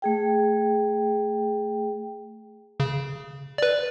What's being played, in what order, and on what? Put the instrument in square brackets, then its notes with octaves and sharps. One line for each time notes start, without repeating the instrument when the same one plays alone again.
[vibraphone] A3 G#4 G5
[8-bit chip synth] C#3
B4 D5